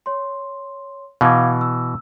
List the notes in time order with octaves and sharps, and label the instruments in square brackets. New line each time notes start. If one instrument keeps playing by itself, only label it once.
[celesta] C#5 C6
[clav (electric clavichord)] B2 E3 [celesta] F5 D6 G#6
[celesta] E6